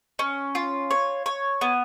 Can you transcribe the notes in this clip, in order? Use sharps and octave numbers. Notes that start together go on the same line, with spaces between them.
C#4
F4
C#5
C#5
B3